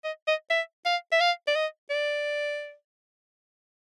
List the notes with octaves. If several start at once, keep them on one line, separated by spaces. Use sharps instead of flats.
D#5
D#5
E5
F5
E5
F5
D5
D#5
D5